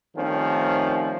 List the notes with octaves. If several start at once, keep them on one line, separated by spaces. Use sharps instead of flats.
D#3 F3 G3 A3 C4 C#4